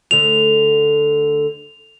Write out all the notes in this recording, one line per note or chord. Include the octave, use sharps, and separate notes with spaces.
D2 D3 F7